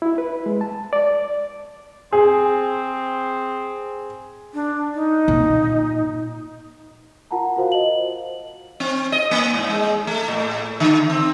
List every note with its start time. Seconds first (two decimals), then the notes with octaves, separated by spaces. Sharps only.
0.02 E4
0.18 B4
0.46 G#3
0.61 A5
0.93 D5
2.13 C4 G#4
4.54 D4
4.95 D#4
5.28 A#2
7.31 F4 A#4 F#5 A5 A#5
7.56 F4 F#4 A#4 C5 F5
7.72 D#5 F#7
8.80 C4
9.12 D#5
9.31 A#3
9.54 G#2
9.69 G#3
10.07 A3
10.28 A2
10.80 D3
11.10 C4